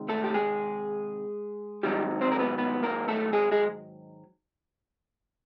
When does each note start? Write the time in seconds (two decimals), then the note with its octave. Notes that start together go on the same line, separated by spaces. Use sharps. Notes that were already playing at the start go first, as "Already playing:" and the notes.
Already playing: C3 D#3 G#3
0.09 A3 A4
0.24 G4
0.34 G#3 G#4
1.83 G#2 D#3 F#3 G3 G4
2.21 C4 C5
2.32 A#4
2.39 B3 B4
2.58 B3 B4
2.83 A#3 A#4
3.08 A3 A4
3.33 G#3 G#4
3.52 G#3 G#4